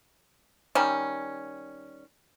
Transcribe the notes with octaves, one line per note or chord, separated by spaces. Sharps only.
D#3 G3 C#4